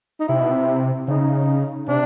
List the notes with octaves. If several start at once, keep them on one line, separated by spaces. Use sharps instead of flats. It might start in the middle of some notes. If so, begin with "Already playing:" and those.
D#4
C3 E4
B2
C3
C#3 D#4
C3 D4